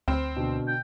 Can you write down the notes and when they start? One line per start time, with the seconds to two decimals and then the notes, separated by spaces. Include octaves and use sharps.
0.08 D2 C4 C5 B5 F6
0.36 B2 D3
0.68 G5